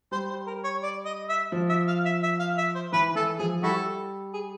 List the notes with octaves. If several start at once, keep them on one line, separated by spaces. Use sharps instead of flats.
G3 C5
C5
A#4
C#5
D5
D#5
E5
F3
E5
F5
E5
E5
F5
E5
C5
E3 B4
E3 A4
F3 G#4
G3 E4 F#4 A4
G#4